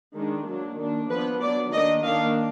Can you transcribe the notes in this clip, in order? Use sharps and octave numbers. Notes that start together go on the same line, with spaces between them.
D#3 G#3 D4
F#3 A#3 D4
D#3 A#3 D4
F3 B3 D4 B4
F#3 B3 D4 D5
D#3 A#3 D4 D#5
D#3 A#3 D4 F5